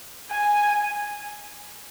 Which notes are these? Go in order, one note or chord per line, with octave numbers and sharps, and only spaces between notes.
G#5